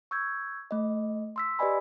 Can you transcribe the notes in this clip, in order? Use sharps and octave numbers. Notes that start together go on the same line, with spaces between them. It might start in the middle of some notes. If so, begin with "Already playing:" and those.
C#6 E6 G6 G#6
A3 D#5
C6 E6 B6
G4 B4 D5 D#5 G#5 B5